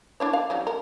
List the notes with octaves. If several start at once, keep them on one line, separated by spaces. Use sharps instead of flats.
D4 E4 C#5
F5
E3 F#3 G3
A#4